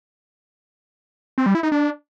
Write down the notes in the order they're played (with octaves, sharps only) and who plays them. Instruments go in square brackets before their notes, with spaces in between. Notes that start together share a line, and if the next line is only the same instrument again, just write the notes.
[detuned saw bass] C4
G3
E4
D#4
D4